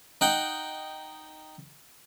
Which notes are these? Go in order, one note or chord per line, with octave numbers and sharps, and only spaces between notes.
D#4 F#5 G5